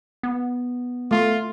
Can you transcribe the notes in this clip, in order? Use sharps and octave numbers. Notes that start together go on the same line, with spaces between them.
B3
A3 F4